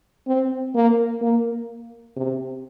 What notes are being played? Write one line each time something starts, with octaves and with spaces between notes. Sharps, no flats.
C4
A#3
A#3
C3